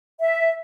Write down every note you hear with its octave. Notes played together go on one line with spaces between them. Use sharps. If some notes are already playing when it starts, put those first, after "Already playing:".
E5